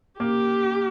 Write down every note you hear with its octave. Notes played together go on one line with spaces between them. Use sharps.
A#3 G4